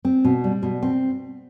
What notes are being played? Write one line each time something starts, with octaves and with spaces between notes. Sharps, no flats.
C4
B2
G3
B2
C4